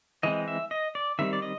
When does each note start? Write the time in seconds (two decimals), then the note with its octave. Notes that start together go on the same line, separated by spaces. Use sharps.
0.23 E3 G#3 C4 D#5
0.48 E5
0.71 D#5
0.95 D5
1.19 D#3 G3 C4 E5
1.33 D5
1.42 D#5